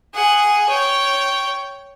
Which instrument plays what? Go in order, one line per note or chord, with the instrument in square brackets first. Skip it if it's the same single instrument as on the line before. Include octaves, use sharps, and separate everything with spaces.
[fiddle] G#4 F#5
C#5 G5